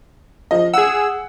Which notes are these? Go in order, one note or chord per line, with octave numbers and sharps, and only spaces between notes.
F3 D#5
G#4 F#5 E6